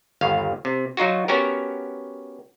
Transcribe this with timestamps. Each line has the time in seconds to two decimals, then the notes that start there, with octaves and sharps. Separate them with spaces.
0.21 G1 D#2 F5
0.65 C3
0.97 F#3 D#4 F4 F#4
1.28 B3 C#4 F#4 G4 A#4